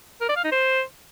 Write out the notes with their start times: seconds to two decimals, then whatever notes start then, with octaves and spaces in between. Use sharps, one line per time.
0.21 A#4
0.29 D5
0.37 F5
0.44 D#4
0.52 C5